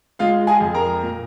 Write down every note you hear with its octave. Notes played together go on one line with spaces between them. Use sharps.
G#3 F4 F5
G#4 G#5
F2
A#4 A#5
A#2